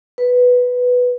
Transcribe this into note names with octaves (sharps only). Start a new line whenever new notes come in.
B4